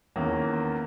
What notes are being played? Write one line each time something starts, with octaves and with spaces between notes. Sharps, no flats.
E2 D#3 A#3 C#4